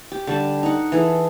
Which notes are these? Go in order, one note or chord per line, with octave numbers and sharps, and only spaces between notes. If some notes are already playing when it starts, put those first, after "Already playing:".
G4
D3 G3 A5
D#4 F#5
E3 G#4 A4